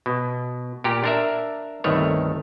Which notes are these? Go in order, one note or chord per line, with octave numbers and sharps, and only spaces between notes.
B2
A#2 G4 A#4
D4 A#4 E5
G1 C2 D#3 A3 C#5